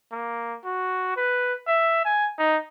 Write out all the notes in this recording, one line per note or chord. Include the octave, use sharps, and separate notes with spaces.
A#3
F#4
B4
E5
G#5
D#4